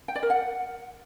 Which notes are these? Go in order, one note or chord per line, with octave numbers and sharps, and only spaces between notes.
G5
D5
A#4
F#5